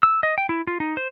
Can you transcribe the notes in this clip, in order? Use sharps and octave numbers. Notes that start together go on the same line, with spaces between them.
E6
D#5
G5
E4
F4
D#4
C5